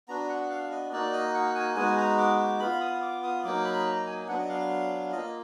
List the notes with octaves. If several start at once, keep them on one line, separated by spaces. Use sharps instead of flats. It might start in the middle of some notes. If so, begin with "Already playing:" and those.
B3 D4 F#4 A#5
F#5
F5
D#5
A#3 D#4 F#4 D5
D#5
F#5
G#5
G#3 B3 D#4 F#4 G#5
A#5
D6
D6
B3 F4 B5
D#6
D6
D#6
F#3 A#3 D#4 D6
B5
A#5
G#5
F#3 B3 D4 F#5
D#5
F5
A#3 F4 D#5